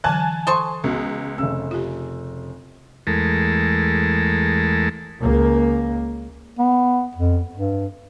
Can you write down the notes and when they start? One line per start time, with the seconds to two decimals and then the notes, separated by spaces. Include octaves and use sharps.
0.04 D3 E3 F#3 G#5 A5 F#6
0.47 A4 C5 C6 C#6 D#6
0.84 C#2 B3 C#4 F#4
1.38 F1 C#3 E6
1.71 F4 G4
3.07 E2 G#3 A3 A4 A#4
5.19 C#2 A#3
6.59 B3
7.15 F2
7.55 G2